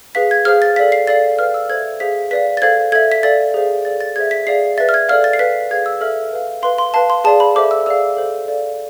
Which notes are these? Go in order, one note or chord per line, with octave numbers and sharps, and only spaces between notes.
G#4 B4 F5 B6
G#6
G#4 C5 F5 F6
A6
A4 D5 F5 B6
C7
A4 D5 F5 A6
B4 F5 F6
E6
A4 C5 E5 G#6
G#4 C5 F5 B6
B4 D5 F5 B6
A6
A4 C5 F5 G#6
A4 E5 G#6
B6
A4 D5 F5 A6
G#4 C5 F5
A4 D5 F5 A6
A6
G#4 C5 E5 G#6
B6
G#4 D5 F5 C7
B4 E5 A6
F6
G#6
A4 D5 F5 F6
A6
C7
B4 F5 B6
G#4 B4 F5 G#6
E6
A4 E5 F6
B4 F5
B4 F5 C6
C6
B4 F5 A5
C6
G#4 D5 F5 A5
B5
A4 C5 E5 D6
E6
G#4 D5 F5 E6
A4 C5 F5
A4 D5 F5